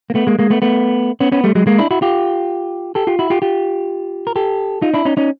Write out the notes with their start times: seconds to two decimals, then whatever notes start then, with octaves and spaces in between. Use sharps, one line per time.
0.10 A#3
0.15 A3 B3
0.27 G#3 A#3
0.39 G#3 A#3
0.50 A3 B3
0.62 A3 B3
1.20 B3 C#4
1.32 B3 C#4
1.44 G3 A3
1.55 F#3 G#3
1.67 G#3 A#3
1.78 D4 E4
1.91 E4 F#4
2.02 F4 G4
2.95 G4 A4
3.07 F4 G4
3.19 E4 F#4
3.30 F4 G4
3.42 F4 G4
4.27 A#4
4.36 G4 A4
4.82 D#4 F4
4.94 D4 E4
5.05 C#4 D#4
5.17 C#4 D#4